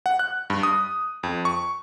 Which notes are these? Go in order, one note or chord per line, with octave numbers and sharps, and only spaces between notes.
F#5
F#6
G2
D#6
F2
C#6